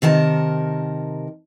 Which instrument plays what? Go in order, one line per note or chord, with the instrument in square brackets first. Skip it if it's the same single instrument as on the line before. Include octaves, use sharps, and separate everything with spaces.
[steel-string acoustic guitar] C3 D#3 A#4 A5